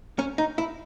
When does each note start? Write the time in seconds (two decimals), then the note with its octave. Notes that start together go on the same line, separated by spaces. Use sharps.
0.19 C#4
0.38 D#4
0.58 E4